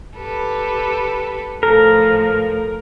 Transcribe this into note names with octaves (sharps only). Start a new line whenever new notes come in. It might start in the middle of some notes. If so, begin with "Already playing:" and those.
G4 A4 B4
A2 F3 A4 A#4